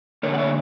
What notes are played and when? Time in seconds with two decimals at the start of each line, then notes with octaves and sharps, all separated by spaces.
0.23 D3 A#3 D4 A#4 C#5
0.34 F#5
0.38 C#5 E5